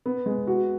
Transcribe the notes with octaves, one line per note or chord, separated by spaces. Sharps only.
B3
G#3
F#4